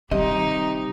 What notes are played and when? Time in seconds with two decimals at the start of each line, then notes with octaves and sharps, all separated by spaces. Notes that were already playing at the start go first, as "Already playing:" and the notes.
0.11 C3 D#3 G3 D#4 G4 D#5